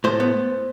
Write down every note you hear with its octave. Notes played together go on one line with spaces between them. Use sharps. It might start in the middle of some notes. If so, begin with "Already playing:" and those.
A2 C5
B3